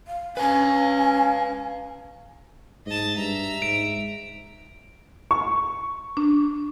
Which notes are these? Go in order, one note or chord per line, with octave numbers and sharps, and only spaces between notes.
F5
C#4 B4 F5 G#5
G#2 D#5 A5
G2 E5 A#5
G#2 D7
C#6
D4